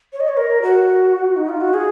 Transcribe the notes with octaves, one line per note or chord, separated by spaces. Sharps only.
C#5
D#5
C#5
A#4
F#4
D#4
F4
F#4
G#4